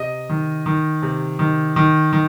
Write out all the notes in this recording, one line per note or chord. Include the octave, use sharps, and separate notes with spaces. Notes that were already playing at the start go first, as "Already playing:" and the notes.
Already playing: C3 D#5
D#3
D#3
C3
D#3
D#3
D#3